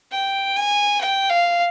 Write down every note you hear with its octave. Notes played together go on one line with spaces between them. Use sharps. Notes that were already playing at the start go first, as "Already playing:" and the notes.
G5
G#5
G5
F5